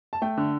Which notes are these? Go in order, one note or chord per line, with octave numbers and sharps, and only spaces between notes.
A5
A3 G5
D3